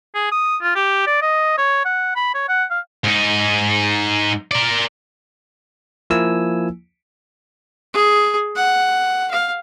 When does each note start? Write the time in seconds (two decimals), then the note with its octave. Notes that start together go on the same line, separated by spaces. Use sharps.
0.15 G#4
0.31 D#6
0.62 F4
0.75 G4
1.07 D5
1.22 D#5
1.58 C#5
1.85 F#5
2.16 B5
2.34 C#5
2.49 F#5
2.70 F5
3.05 G#2 D#4
4.51 A#4 D5
6.10 F3 A#3 E4 G#5 E6
7.93 G#4
8.56 F#5
9.31 F5